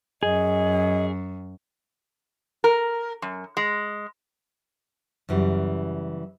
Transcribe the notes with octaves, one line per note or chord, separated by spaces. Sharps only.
F#2 G#4 D#5
A#4
F#2
G#3
F#2 C#3 E3 G3